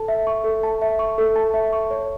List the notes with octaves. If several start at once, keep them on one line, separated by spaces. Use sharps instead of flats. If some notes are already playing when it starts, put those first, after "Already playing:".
Already playing: A4 A5
E5
C#6
A4
A5
E5
C#6
A4
A5
E5
C#6
C#5